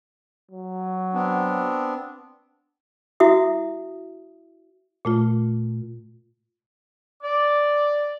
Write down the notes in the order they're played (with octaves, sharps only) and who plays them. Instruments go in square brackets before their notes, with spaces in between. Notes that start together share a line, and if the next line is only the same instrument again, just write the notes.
[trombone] F#3
[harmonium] B3 C4 D4
[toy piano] E4 F#4 E5 D#6
[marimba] A#2 A3 F4
[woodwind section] D5